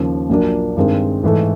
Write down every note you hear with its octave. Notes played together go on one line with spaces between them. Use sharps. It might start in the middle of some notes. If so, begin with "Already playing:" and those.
Already playing: D#2 C#3 F3
A#1 A#2 F#3 A#3 D4
G2 D#3 G#3 C4
G#2 E3 A3